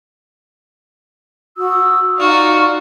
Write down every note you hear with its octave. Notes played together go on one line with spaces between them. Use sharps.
F#4 D#6 E6
D#4 F4 F#4 D5 F6